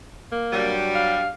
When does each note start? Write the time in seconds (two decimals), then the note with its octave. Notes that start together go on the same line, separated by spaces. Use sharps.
0.32 A#3
0.53 G2 F#3 G3
0.95 F5